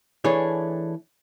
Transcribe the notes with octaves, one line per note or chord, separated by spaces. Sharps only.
E3 A3 D4 G#4 C#5